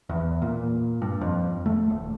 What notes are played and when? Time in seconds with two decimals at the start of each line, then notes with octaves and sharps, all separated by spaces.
0.09 E2
0.42 A#2
1.02 G2
1.21 F2
1.66 A3
1.90 D#1